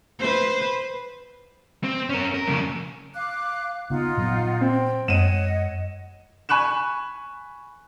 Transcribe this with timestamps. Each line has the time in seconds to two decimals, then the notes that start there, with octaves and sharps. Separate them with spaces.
0.19 B4 C5
1.84 C4
2.10 C#4 A#4
2.34 A#4
2.47 F2 C#3
3.15 F5 D6 F#6
3.90 C#3 B3 D#4 F4 F#5
4.17 A#2 F#3 B3
4.61 C4 G5
5.08 F#2 G#3 C#5 D#5 F#5 D#7 E7
6.49 G#5 B5 C#6 F#6 E7